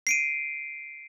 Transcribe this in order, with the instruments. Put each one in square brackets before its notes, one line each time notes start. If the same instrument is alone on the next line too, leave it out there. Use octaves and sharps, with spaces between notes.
[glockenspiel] C7 D7 D#7